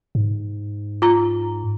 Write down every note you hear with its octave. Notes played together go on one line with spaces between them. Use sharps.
G#2
F4 A#5